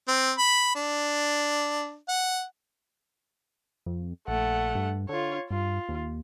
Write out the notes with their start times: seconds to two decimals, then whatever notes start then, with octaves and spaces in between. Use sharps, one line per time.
0.08 C4
0.38 B5
0.75 D4
2.09 F#5
3.86 F2
4.28 A#1 A3 F#5
4.75 G2
5.09 D3 F4 C#5
5.51 G2 F4
5.89 D#2